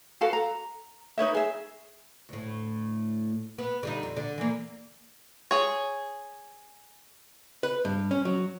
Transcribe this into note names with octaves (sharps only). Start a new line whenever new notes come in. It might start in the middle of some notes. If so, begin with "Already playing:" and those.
F#4 A4 B4 F5
A#5
D#4 B4 C#5 E5
G#4 E5
D2 A2
B3
D3 G3 D#4
F2
D3 D5
E3 A#3
G#4 C#5
B4
G2
C#4
F#3